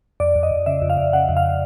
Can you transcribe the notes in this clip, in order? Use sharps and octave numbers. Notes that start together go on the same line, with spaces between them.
F2 D5
F2
D#5
F2
C#3 E5
F2
F5
F2
C#3 F#5
F2
F5